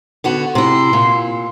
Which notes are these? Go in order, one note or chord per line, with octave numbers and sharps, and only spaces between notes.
D3 B3 F#4
C3 E4 C6
A#2